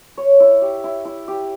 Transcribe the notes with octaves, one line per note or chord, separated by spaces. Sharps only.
C#5
E4
G4
E4
E4
G4